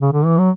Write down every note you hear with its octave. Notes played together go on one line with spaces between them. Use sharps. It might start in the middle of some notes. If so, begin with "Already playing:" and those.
C#3
D3
E3
F#3